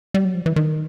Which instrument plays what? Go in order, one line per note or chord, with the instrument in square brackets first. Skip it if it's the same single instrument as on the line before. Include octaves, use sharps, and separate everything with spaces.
[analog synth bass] G3
F#3
F3
E3
D#3